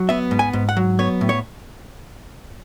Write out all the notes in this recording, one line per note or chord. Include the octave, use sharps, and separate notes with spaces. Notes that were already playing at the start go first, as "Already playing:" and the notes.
Already playing: F#3
B3 E5
G#2
G#5
G#2
F#5
F#3
B3 C#5
A2
C#5